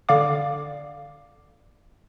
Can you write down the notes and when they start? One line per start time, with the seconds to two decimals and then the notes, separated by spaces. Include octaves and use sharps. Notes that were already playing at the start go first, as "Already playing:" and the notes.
0.09 D3 D5 F5 D6